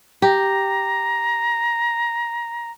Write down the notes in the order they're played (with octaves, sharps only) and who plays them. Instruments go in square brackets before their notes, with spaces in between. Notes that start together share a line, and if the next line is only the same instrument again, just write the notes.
[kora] G4 [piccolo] A#5